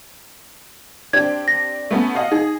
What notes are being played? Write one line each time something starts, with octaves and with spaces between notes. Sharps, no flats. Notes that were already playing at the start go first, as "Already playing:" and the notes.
C4 D4 G4 G#6
A#6
A3 B3 C#4
D#5 F5 F#5
D#4 G#4